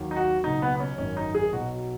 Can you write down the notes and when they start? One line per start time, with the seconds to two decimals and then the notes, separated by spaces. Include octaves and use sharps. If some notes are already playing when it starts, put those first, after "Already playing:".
Already playing: D#2 D#3 F#3
0.11 D#4
0.16 F#4
0.44 C#2 B2 F#3 D#4
0.62 B3
0.75 B3
0.80 C#4
0.98 G#1 F#2 D#3 C#4
1.17 D#4
1.35 G#4
1.53 B1 B2 F#3 F#4